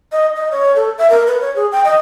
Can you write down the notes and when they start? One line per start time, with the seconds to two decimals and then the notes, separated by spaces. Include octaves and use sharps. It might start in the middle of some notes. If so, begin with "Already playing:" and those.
0.12 D#5
0.36 D#5
0.52 C#5
0.76 A4
0.98 E5
1.10 A#4
1.27 B4
1.41 C#5
1.56 G#4
1.72 G5
1.85 D#5